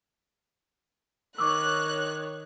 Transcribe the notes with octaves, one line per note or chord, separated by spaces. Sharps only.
D#3 C#5 C#6 D6 E6 F#6